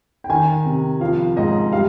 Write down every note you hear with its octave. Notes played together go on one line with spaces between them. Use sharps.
G5
D#3 G#5
C3
F3 F5
G#2 D#5
G3 F5